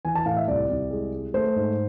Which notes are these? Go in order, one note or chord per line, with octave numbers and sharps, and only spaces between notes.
E3 G#5
A5
A2 F5
E5
C2 D5
C2
G#3
G#3
A3 C5
G#2